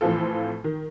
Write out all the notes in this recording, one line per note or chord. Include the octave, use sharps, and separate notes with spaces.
A2 E3 F3 C4 F4 A4
D#3